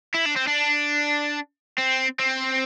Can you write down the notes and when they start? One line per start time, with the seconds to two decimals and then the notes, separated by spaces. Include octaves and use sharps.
0.15 E4
0.26 D4
0.36 C4
0.48 D4
1.78 C4
2.19 C4